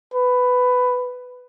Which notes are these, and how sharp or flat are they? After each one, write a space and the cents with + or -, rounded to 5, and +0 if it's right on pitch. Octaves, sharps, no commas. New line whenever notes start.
B4 +10